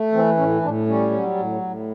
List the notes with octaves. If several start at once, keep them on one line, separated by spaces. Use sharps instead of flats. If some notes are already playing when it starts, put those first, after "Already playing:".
Already playing: A3
E3 C4
A2 C#4
A2 D4
G3 C#4
F#3
A2
A2